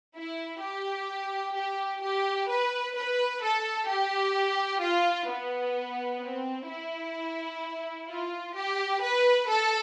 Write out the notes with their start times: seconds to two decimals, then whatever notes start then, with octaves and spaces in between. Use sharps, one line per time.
0.16 E4
0.61 G4
1.55 G4
2.02 G4
2.48 B4
2.95 B4
3.43 A4
3.88 G4
4.82 F4
5.29 B3
6.22 C4
6.69 E4
8.09 F4
8.56 G4
9.02 B4
9.49 A4